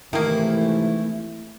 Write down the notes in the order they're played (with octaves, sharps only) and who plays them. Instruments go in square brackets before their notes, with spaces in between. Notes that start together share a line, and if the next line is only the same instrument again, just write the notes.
[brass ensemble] G#2 C3 E3 [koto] D#3 A#3 [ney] A3 [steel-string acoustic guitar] E4